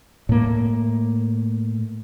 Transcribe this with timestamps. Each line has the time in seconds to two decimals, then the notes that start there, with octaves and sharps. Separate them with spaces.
0.29 A2 A#3